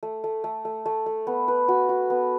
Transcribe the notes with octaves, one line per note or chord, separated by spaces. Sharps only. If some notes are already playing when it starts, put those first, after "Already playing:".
A3
A3
A3
A3
A3
A3
B3
B4
F#4
F#4
B3